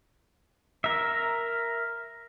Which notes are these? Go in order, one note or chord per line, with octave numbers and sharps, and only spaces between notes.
A#4 E5